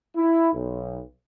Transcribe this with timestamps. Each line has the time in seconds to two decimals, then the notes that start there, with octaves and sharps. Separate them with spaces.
0.15 E4
0.53 B1